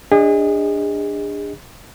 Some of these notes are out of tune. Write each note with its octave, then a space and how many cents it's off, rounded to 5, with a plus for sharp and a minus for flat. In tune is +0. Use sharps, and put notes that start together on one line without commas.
D4 +0 G#4 -35 D#5 +10